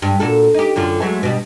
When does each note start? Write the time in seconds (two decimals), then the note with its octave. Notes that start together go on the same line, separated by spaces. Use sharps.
0.02 G2
0.20 A#2 F#4 A4
0.54 D#4 G4
0.76 F#2 D3 F4
1.01 F#3 G#3 A3
1.21 G2 B2 G3